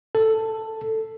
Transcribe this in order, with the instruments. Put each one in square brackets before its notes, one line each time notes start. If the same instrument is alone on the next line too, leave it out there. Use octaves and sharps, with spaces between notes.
[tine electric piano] A4